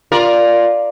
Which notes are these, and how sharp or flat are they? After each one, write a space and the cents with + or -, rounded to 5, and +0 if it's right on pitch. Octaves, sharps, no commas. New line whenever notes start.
F4 +0 A#4 +10 D5 +0